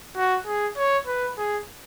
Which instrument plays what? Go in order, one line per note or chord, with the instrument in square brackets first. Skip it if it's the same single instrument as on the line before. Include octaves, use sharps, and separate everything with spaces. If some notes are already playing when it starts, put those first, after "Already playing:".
[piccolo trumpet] F#4
G#4
C#5
B4
G#4